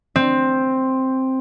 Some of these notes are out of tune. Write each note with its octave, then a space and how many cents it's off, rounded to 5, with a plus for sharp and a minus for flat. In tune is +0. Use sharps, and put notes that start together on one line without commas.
C4 +5